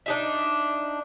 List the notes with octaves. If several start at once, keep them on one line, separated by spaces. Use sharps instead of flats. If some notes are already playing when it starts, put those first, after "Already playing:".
D4 D#4 E5